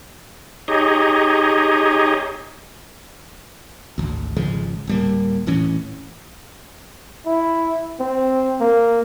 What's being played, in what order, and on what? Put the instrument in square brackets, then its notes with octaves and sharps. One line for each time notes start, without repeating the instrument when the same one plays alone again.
[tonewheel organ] D#4 G4 G#4 C#5 D#5
[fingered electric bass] G#1 D2
G#1 C#3 F3 G#3
D1 G3 A#3
D#1 A2 E3 C#4
[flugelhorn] E4
C4
A#3